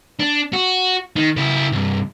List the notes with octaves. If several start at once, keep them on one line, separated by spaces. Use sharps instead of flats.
D4
F#4
D#3
C#3 E4
C2 G2